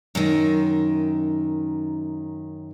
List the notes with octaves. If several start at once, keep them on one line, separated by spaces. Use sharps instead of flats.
F#2 D#3